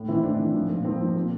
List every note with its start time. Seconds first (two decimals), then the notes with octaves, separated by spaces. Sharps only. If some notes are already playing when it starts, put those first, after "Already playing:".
Already playing: A2
0.08 E3 C4 E4
0.23 A2 D4
0.39 E3
0.54 F3
0.69 A#2
0.85 F3 C4
1.00 F3
1.16 A#2